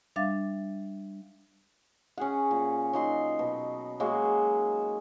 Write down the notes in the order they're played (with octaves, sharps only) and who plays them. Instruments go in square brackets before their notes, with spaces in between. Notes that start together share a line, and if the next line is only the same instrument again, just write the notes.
[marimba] G3 D4 E5 F5 D6 A6
[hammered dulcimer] C#4 G#4 F#5
A#2
F#3 D#4 C6
B2
F#3 G#3 A#3 F#4